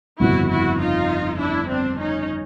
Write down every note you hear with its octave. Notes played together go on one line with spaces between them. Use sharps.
G1 F2 C#3 F3 E4 F#4
E4 F#4
D#4 F4
D4 E4
C4 D4
C#4 D#4